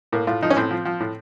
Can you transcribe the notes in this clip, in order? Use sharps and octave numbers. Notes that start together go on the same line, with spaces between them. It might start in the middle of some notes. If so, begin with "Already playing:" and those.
A2 A#3
A2 F4
F3 D#4
C#4
A2 C4
F3
F3
A2